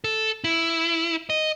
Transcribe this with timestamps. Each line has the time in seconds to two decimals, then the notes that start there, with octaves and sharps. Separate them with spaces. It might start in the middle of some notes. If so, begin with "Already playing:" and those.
0.04 A4
0.44 E4
1.30 D#5